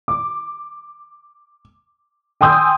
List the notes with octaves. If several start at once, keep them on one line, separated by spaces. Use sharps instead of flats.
D6
G5 G#5 C6 D#6 E6 G6